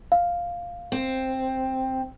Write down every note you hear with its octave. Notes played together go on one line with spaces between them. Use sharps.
F5
C4